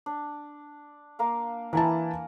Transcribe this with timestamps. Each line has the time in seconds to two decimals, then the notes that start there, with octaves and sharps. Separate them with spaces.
0.06 D4
1.19 A#3 A#4 F5
1.73 E3 E4 A#4 F#5 G#5 A5